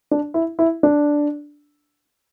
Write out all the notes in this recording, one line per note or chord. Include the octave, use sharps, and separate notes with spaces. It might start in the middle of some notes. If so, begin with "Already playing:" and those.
D4
E4
E4
D4